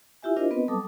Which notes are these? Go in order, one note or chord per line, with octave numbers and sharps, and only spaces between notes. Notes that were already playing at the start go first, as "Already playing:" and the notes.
E4 F4 G4 E5 G#5
D4 F4 A#4 C5 D#5
B3 C4 B4 D#5
F#3 G3 A4 A5 D6 D#6